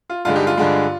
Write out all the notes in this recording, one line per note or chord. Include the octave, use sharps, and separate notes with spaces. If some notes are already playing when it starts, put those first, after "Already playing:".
F4
G2 D3 G#3 F4
D#4 G4
F4
G2 D3 G#3